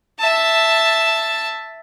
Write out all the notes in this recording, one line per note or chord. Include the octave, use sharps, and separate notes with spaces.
E5 A5